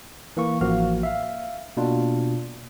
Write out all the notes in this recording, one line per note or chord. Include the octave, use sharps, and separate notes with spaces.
E3 A#3 C#6
A1 F3 A#3 F#4 F5 F6
E5 F5
B2 A#3 D4 F4